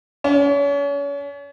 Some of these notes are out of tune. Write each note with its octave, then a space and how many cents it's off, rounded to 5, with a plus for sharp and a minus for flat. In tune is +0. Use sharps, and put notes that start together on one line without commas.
C#4 +35